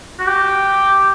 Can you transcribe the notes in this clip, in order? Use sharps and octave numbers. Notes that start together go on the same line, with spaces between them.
F#4
G4